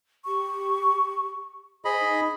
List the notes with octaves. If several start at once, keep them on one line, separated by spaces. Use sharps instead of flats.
G4 C#6
G#4 C5 D#5 B5
D#4